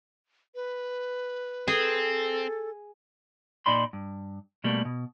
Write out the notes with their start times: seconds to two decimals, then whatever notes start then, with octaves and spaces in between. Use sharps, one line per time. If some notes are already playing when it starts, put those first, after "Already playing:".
0.55 B4
1.68 C4 G#4 A4
3.66 A#2 D#4 D5 B5 C6
3.93 G2
4.64 B2 G3 A3 A#3
4.85 B2